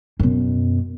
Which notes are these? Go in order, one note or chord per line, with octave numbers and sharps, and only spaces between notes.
F#2 B2